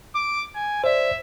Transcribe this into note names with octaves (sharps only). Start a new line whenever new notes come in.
D6
G#5
C5 D5 E5